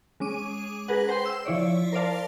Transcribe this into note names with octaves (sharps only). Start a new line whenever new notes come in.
G#3 C#4 D6 D#7
G#4 A#4 B4 F#5
C5 G5 C6
E6
F3 E4 C#5 D5
A#4 C5 D5 F5 A5